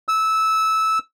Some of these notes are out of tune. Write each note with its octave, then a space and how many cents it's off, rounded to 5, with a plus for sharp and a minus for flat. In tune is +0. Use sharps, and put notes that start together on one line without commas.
E6 -15